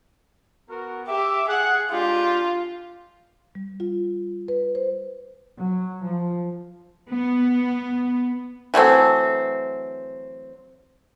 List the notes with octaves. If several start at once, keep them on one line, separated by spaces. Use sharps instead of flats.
B3 F#4 A#4
G4 E5 D6
G#4 F#5
G#3 D4 F4 G4
G3
F4
B4
C5
F#3
F3
B3
E3 F#3 A3 C4